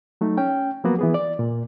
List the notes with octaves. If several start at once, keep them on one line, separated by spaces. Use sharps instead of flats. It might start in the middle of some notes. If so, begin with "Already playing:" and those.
F#3 A3 D#4
C#4 G5
F3 F#3 A#3 B3 F#4
E3 B3 G#4
D5
A#2